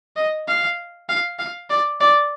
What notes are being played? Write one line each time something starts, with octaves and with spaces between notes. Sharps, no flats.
D#5
F5
F5
F5
D5
D5